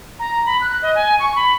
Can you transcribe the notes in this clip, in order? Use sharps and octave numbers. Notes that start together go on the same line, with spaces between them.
A#5
B5
F#6
D#5
G#5
C#6
B5